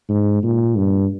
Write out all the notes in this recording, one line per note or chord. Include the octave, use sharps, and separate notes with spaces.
G#2
A#2
G2